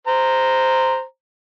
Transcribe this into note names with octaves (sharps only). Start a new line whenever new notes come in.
C5 A#5